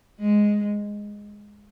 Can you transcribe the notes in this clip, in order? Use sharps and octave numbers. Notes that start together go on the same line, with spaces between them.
G#3